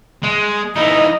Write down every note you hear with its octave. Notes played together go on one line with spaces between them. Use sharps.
G#3
E3 D#4 D#5